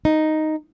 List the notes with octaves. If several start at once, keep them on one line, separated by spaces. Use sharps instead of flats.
D#4